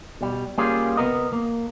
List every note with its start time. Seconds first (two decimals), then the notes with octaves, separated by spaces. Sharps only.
0.21 B2 G3
0.58 G3 A#3 C#4 F4 G4 G#4
0.97 C3 B3 A#4 D#5
1.33 A#3